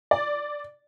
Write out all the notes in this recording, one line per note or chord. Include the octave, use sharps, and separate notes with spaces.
D5